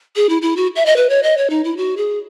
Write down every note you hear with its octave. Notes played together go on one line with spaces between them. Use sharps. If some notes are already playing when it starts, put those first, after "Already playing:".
G#4
E4
E4
F#4
E5
D#5
B4
C#5
D#5
C#5
D#4
E4
F#4
G#4